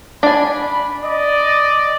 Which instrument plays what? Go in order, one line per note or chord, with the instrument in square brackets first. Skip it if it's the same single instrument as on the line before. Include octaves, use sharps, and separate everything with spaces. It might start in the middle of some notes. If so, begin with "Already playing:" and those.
[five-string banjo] D4 G#5 [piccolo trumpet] B5
[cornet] D5 [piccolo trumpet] D#5